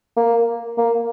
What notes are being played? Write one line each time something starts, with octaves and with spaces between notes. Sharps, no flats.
A#3
A#3